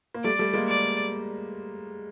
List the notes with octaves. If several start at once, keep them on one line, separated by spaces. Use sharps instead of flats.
A#3
G3 A3 D5
G3 A3
G#3 A#3
D5